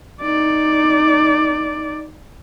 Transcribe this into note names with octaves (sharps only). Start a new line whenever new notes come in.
D#4 D5